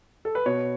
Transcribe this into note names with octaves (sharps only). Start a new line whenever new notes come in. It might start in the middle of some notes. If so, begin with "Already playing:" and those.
A4
B4
B2 C#5